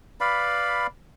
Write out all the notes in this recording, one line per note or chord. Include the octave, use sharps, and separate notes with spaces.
B4 D5 F5 B5